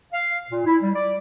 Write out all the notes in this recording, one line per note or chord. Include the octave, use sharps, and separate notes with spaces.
F5
A#2
E4
G3
D5